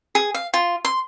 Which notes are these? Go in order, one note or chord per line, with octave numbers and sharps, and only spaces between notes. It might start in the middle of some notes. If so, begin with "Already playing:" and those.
G#4
F5
F4
C6